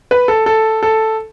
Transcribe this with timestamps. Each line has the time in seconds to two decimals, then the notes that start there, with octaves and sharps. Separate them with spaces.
0.11 B4
0.28 A4
0.46 A4
0.83 A4